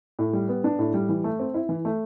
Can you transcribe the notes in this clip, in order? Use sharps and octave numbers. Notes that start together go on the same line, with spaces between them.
A2
G3
B3
D4
A2
G3
E3
A3
C4
E4
E3
A3